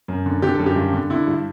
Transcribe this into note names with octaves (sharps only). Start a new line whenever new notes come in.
F#2
D3
D3 G4
A4
F#2
G4
G2
D3
D3 E4
G2